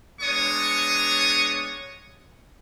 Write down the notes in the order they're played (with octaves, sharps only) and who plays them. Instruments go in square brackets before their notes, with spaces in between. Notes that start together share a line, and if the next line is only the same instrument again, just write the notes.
[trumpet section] G#3 B3 D4 C#5 C#6 D#6